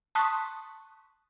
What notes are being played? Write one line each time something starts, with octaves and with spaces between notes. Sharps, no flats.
A5 C6 C#6 D#6 F#6 B6